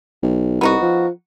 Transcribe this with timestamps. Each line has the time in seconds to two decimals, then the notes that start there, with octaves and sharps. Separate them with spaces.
0.23 B1
0.61 C2 B3 D#4 F#4
0.82 F3